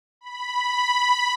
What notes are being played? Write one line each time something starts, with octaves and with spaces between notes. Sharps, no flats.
B5